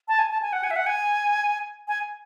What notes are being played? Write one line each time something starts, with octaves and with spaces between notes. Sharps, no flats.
A5
G#5
A5
G#5
F#5
G#5
E5
F#5
G#5
G#5